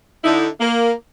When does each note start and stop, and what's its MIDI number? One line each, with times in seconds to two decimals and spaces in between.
0.24 0.48 50
0.24 0.48 63
0.24 0.48 64
0.60 0.92 58